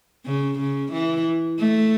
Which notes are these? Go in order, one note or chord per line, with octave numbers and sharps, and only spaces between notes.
C#3
C#3
E3
A3